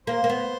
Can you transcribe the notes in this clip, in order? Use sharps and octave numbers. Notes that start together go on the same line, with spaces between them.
A#3 C5
A#3
B3